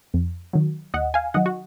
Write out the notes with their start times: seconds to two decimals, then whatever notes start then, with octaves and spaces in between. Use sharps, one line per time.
0.14 F2
0.53 D#3 F#3
0.94 D#2 D#5 F#5
1.14 F5 G#5
1.34 D#3 F#3 D#5 F#5
1.46 F#4